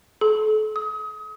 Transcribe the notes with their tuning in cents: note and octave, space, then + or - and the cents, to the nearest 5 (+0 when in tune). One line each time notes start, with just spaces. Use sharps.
A4 -35
D#6 +30